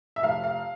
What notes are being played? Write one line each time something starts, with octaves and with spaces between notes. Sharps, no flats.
E5
F1 F5
F5